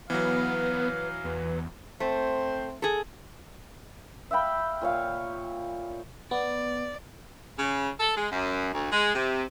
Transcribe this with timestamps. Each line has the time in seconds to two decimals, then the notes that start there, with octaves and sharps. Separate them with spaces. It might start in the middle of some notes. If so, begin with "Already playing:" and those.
0.10 E3 F#3 B3 B4 F5
1.24 E2 B4
2.00 A3 C4 C5
2.82 G#4 A4
4.31 E5 F5 G5 B5
4.82 A#2 C#5 F5
6.31 B3 D5
7.59 C#3
8.00 A4
8.17 G#3
8.31 F#2
8.73 D2
8.92 G#3
9.15 C3